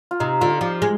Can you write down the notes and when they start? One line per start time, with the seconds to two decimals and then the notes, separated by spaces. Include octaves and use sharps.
0.11 F4
0.20 C3 D#4
0.41 D3 F4
0.61 F3 G4
0.82 G#3